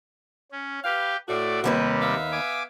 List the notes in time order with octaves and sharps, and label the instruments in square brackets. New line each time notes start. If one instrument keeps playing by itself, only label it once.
[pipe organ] C#4
[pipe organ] G4 G5 [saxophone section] B4 F5
[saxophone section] A2 F#4 [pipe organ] A3 D5
[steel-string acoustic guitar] D#2 A#3 B4 [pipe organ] C3 G3
[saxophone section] B3 E5 F5
[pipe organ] G#5 D6